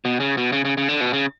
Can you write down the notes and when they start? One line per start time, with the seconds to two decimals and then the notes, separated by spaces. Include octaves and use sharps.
0.05 B2
0.20 C#3
0.37 B2
0.52 C#3
0.65 C#3
0.77 C#3
0.88 D3
1.01 B2
1.13 C#3